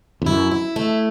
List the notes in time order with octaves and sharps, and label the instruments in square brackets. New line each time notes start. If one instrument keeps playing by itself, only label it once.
[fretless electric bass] E2
[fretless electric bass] F#2 [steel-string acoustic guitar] E4
[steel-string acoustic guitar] E4
A3